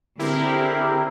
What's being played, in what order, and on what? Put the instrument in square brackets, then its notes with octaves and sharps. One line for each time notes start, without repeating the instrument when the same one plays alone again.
[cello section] D3 C4 G#4 [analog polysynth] E4 G4 A#4